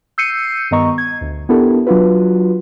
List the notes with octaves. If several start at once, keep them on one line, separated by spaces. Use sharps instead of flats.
E6 G6 C7 C#7 D#7
G2 D#3 B3 D#5 A#5 C#6
G#6
D2
B3 D4 E4 G4 A4 A#4
F#3 D4 F4 F#4 B4